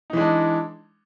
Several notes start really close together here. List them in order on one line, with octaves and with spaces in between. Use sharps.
D#4 E3 G#3 D4